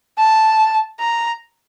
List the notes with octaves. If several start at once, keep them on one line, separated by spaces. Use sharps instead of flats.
A5
A#5